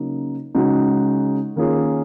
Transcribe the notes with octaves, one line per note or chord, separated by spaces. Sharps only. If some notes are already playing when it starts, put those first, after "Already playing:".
Already playing: C#3 F#3 A#3 D#4
C#3 G#3 D#4 F#4
D#3 A#3 C#4 F4 G#4